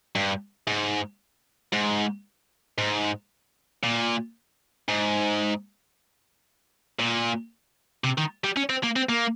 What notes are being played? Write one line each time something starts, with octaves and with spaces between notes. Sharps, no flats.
G2
G#2
G#2
G#2
A#2
G#2
A#2
C3
D#3
G3
C#4
C4
A#3
C4
A#3